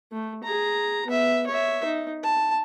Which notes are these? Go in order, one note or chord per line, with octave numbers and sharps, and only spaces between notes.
A3
G#4 A#5
B3 E5
C#5 E5
D#4
A5